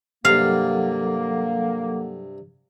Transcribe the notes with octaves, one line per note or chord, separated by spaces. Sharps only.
G2 C3 F#3 A#3 A4 F5 F#5